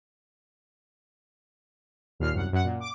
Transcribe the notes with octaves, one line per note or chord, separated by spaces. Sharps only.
D#2 A#2 F6 C7
C2 F#2 F#5
F#2 F#5
A#2
D6